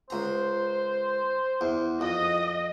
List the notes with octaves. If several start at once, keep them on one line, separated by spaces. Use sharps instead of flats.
C#2 C5 A#5
E2
F2 D#5